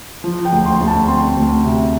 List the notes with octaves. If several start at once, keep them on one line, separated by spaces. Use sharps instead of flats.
F3
G5
D2
C6
D2
A5
C4 C6
D2
C3